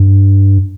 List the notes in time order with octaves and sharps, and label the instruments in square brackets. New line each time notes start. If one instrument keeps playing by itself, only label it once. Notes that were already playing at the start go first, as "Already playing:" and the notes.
Already playing: [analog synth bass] G2